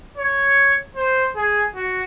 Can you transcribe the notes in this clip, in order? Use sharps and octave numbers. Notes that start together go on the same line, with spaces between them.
C#5
C5
G#4
F#4